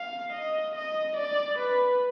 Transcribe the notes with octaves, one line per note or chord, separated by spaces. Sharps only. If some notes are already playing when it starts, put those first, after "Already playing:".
Already playing: F5
D#5
D#5
D5
B4